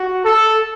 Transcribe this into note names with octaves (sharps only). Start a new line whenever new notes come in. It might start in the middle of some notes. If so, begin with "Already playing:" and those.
Already playing: F#4
A4